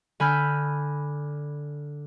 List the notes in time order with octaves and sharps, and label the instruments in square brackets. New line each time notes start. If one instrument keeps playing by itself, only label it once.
[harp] D3 G#5 B5 E6 F6 G6